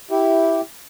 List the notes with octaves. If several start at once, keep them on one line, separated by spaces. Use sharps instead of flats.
E4 G4